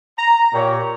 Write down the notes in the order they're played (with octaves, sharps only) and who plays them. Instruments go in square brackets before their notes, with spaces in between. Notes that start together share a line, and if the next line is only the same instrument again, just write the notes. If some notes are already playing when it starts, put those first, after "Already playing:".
[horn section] A#5
A#2 G4 C#5